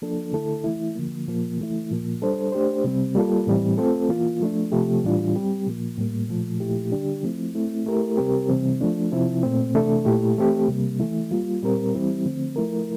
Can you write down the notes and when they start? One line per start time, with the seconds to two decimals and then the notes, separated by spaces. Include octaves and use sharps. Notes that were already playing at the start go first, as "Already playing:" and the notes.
0.02 F3 A#3 D4 A4
0.33 D3 A3 E4 A4
0.64 E3 A3 E4
0.95 D3 F3 A#3
1.27 A#2 F3 A#3
1.58 E3 A3 E4
1.91 A#2 F3 A#3
2.22 G3 D4 A4 C5
2.52 A3 D4 G4 C5
2.84 C3 G3 C4
3.15 G3 A#3 F4 A4
3.47 A2 E3 G3 C4
3.78 A3 C4 F4 A4
4.09 E3 A#3 F4
4.41 F3 A3 D4
4.72 C3 F3 A3 C4 G4
5.03 A2 E3 G3 D4 F4
5.35 G3 C4 G4
5.67 A#2 F3 A#3
5.98 A2 G3 A#3
6.29 A#2 F3 A3
6.60 A#2 F3 A3 E4 G4
6.92 D3 G3 D4 G4
7.23 F3 A3 C4 E4
7.55 A3 C4 E4
7.86 A3 E4 G4 A#4
8.17 C3 G3 C4 G4 A#4
8.49 C3 E3 G3 C4
8.81 F3 A3 D4
9.12 C3 F3 C4 E4
9.43 A#2 A3 C4
9.74 C3 E3 A3 D4 A4
10.05 A#2 A3 E4 G4
10.37 E3 A3 C4 G4
10.68 C3 G3 A#3
11.00 E3 A3 E4
11.31 G3 A#3 F4
11.62 A#2 G3 C4 G4 A#4
11.94 E3 G3 C4 E4
12.26 D3 F3 A3 C4
12.56 F3 A3 E4 A#4